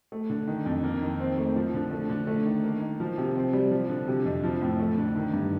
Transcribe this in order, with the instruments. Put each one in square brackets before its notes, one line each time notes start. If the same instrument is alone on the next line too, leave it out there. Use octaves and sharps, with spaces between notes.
[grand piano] A3
D3
D#3
F2
A#3
D#3
C4
A3
F3
D3
A3
D3
A3
D#3
A#3
D#3
F3
C3
C4
G3
F3
D3
C3
F2
F3
A2
A3
D3
D#3
G2